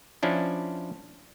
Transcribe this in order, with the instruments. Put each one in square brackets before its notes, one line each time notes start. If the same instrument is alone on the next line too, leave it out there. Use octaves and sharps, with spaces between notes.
[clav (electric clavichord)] F3 C#4 D4 E4